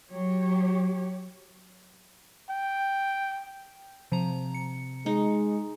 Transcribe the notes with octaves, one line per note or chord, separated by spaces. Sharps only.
F#3 G4 C#5
G5
C3 F3 A#5
C#7
G#3 D#4